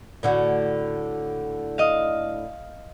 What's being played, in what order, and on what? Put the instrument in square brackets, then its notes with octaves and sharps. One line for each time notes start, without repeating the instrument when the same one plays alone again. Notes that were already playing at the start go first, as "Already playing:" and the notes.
[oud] A2 D3 F#4
[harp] D#5 F5